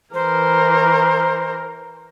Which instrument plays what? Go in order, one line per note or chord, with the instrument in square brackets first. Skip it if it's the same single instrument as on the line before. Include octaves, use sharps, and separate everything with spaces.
[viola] E3 A#4 [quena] C5